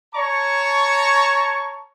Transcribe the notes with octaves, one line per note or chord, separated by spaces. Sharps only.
C#5 A5 A#5 C#6